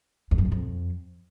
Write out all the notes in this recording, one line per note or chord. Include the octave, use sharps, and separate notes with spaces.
E2
F#2
A#2
F2